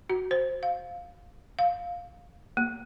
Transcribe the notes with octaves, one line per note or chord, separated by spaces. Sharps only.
F#4
C5
F5
F5
A#3